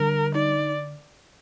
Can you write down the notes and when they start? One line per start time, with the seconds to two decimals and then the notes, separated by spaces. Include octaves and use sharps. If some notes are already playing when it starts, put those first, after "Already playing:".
Already playing: D3 G3 A#4
0.35 D#4 D5